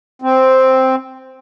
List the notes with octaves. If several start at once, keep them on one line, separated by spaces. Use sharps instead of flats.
C4